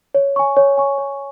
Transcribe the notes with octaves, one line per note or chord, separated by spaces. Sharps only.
C#5
G#5 C#6
C#5
G#5 C#6
C#5